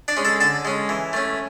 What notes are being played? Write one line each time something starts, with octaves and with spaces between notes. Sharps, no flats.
D4 D5
G#3 C#4
A4 A5
D3 A4 A5
G#3 C#4
E3
A3 C#4